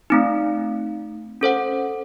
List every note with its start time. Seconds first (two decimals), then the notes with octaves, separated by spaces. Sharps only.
0.10 A3 C4 D#4
1.41 C#4 A4 C5 F#5